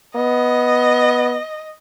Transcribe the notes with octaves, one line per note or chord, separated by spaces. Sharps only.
B3 D#5